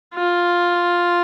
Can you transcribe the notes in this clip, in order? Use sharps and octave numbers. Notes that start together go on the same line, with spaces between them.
F4